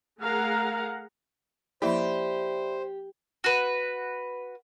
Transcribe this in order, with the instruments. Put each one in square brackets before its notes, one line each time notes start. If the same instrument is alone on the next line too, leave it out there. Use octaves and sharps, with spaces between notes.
[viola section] A3 G#4 A#4 F5 F#5 A#5
[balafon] F3 A#3 E4 [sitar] G4 [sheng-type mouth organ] C5 [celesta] D5 E5 B5
[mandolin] F#4 B4